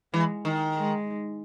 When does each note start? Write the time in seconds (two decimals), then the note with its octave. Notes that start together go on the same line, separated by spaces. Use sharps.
0.13 E3 G#3
0.45 D#3
0.76 G#3